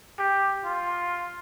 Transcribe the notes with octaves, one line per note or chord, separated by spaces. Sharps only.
G4
F4